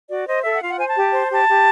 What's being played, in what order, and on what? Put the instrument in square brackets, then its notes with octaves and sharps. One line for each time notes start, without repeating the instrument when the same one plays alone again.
[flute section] F#4 D5
C5 D#5
A4 E5
F#5
F4 F5
F#5
C5 G#5
A5
G4
C5
G4 A5
G4